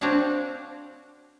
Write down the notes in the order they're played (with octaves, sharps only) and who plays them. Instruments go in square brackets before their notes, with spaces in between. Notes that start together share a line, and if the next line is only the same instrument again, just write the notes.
[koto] C4 D4 F#4 C#5 F5 F#5